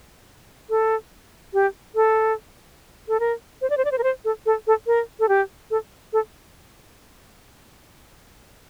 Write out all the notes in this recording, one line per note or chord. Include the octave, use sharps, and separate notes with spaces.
A4
G4
A4
A4
A#4
C5
D5
C5
D5
C5
A#4
C5
A4
A4
A4
A#4
A4
G4
A4
A4